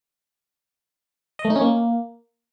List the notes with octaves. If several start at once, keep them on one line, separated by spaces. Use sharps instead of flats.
D#5
A3
D#4
C#4
A#3